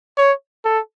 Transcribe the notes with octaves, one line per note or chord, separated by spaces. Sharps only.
C#5
A4